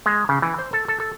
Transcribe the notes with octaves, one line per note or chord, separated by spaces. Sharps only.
G#3
C#3
E3
C5
A4
A4
A4